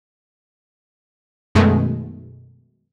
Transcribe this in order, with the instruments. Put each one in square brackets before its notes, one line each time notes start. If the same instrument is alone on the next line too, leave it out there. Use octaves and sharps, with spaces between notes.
[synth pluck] F#2 B2 D#3 G#3 A3